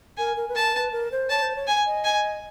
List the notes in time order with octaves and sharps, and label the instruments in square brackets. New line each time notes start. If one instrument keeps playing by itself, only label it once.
[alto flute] A#4 [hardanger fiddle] G#5
[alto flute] A#4
B4
[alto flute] A#4 [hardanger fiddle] A5
[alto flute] B4
A#4
C5
[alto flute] C#5 [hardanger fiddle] A5
[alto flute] C5
C#5
[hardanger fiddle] G#5
[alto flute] D#5
[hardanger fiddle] G#5